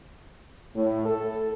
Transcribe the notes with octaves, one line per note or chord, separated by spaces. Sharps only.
A2
A4